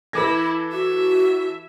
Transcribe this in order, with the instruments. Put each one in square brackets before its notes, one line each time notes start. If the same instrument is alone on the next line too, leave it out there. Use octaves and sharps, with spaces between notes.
[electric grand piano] E3 A4 A#6 [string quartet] E4 [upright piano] B4 D6 G#6
[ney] F#4 [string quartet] E5